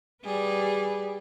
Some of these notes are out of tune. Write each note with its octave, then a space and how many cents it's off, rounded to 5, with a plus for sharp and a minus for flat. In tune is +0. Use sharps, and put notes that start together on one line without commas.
G3 -5 G#4 -15 B4 +0